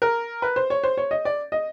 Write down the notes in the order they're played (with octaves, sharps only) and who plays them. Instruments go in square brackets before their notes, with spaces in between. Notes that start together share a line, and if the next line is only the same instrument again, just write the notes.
[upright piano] A#4
B4
C5
C#5
C5
C#5
D#5
D5
D#5